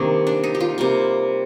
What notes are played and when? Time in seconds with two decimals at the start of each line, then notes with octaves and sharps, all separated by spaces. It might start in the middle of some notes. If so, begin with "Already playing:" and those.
Already playing: C3 D#3 G3 A#3 D4
0.27 D4
0.44 D#4
0.55 G4
0.61 F4
0.78 C3 G3 A#3